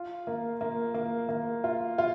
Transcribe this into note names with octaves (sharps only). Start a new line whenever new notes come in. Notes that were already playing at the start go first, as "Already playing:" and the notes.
Already playing: F4
A#3
A#3
A#3
A#3
F4
F4